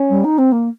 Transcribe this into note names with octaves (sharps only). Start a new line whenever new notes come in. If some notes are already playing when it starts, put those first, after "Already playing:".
Already playing: C#4
G3
D#4
C4
A#3